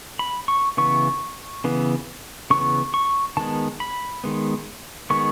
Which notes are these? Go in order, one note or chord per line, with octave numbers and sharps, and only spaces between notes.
B5
C#6
C#3 E3 B3 C#6
C#3 E3 B3
C#3 E3 B3 C#6
C#6
D#3 G#3 B3 A5
B5
D#3 G#3 B3
D#3 G#3 B3 C#6